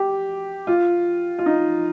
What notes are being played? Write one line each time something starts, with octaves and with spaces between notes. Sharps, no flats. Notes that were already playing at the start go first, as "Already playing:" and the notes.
Already playing: G4
F4
F4
D#4